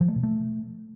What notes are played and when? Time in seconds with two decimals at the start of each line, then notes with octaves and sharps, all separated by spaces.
0.01 F3
0.08 A3
0.16 B2
0.23 A3